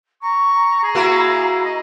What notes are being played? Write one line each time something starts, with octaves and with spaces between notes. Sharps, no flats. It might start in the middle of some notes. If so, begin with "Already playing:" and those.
A#5 C#6
G#4
A#3 E4 F#4
D#5